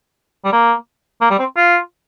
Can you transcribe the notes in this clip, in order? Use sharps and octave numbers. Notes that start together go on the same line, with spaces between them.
G3
A#3
A#3
G3
C4
F4